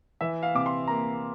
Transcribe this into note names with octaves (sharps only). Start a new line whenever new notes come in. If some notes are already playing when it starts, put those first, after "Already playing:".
E3 E5
F5
C3 D6
C6
A#3 A#5